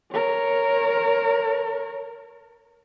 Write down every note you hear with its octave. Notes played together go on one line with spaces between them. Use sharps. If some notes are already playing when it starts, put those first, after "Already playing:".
A#4 C#5